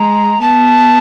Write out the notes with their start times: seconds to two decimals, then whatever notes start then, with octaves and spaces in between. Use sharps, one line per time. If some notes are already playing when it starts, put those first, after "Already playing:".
Already playing: G#3 A#5
0.41 B3 A5